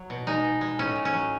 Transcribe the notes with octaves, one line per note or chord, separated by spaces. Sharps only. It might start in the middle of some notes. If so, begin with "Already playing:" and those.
Already playing: F#3
B2
G#3 D#4
B2
G#3
A2 C#4
A2
C#4
F#3